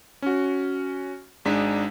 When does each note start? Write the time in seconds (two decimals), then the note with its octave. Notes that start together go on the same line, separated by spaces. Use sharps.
0.22 C#4 F#4
1.45 G#1 G#3 D4 D#4 B6